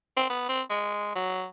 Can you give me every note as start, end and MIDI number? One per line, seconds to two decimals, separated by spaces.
0.17 0.30 60
0.30 0.47 59
0.49 0.62 60
0.70 1.11 56
1.15 1.46 54